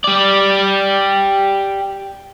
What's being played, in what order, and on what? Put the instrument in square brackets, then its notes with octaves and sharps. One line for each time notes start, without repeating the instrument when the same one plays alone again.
[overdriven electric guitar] G4 D5